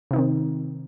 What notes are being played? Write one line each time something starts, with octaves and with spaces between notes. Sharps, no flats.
C3 D#3 C4 D#4